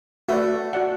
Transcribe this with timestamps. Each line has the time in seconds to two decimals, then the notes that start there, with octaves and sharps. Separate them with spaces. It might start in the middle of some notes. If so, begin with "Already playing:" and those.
0.29 A3 F#4 B4 D5
0.73 F#4 D5 F#5